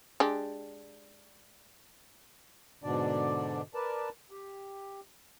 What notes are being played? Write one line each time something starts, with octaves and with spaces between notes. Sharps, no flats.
G#3 D4 G4
G#2 B2 D3 D4 D5
A#4 B4 D5 A5
G4